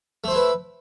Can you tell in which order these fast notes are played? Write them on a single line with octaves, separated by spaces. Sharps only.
A3 C5 E4 B4